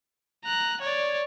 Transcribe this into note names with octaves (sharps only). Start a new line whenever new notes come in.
A#5 F#6
C#5 D5